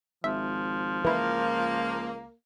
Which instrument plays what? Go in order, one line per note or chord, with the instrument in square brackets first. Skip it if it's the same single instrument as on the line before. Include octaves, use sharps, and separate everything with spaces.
[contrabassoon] G#1 [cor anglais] F3 [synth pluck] E5
[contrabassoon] C#2 [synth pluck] E3 E4 [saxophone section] A#3